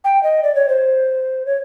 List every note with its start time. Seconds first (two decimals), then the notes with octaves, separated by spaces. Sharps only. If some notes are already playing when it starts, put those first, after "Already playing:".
0.04 G5
0.23 D#5
0.43 D5
0.55 C#5
0.69 C5
1.46 C#5